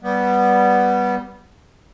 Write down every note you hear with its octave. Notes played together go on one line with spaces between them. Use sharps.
G3 B3